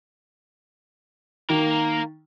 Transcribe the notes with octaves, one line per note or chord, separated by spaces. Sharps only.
D#3 A#3 A#4